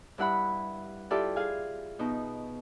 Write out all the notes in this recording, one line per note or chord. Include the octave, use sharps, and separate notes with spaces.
G2 E4 F#5 B5
E4 F4 G4 A4 D5
G#4 F5 G#5
B2 D#4